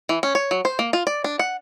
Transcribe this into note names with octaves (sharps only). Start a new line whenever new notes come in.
E3
C#4
C#5
F#3
C5
A#3
F4
D5
D4
F#5